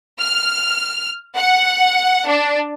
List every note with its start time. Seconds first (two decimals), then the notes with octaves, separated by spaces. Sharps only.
0.20 F6
1.37 F#5
2.27 D4